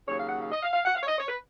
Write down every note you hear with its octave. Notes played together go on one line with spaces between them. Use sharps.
D#2 C#3 F#3 C#5
F5
F#5
F5
D#5
F5
F5
F#5
F5
C#5
D#5
C#5
B4